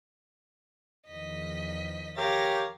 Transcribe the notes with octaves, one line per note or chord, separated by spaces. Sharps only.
E2 D#3 F3 D#5 B6
G4 A#4 C#5 F5 A6 A#6